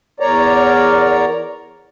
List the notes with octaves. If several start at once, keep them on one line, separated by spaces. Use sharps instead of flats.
E2 A#4 C#5 D5 A#5